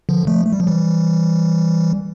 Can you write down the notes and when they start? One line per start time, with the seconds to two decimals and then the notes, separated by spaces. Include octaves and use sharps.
0.09 D3 F3
0.27 F3 A3
0.45 A3
0.53 G3
0.60 F3
0.67 E3 G3